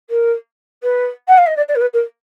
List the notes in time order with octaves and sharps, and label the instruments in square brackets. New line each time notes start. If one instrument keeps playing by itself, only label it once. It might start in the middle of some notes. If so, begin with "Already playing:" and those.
[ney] A#4
B4
F#5
F5
D#5
D5
D5
A#4
B4
A#4